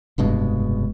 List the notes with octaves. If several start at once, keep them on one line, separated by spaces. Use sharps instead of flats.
F1 G2 B2 G#3